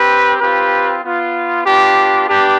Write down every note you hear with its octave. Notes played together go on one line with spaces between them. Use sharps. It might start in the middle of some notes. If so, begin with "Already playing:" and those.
Already playing: C4 G4 B4
C4 F4 G4 B4
B3 F4
B3 D4 F4 G4
B3 D4 G4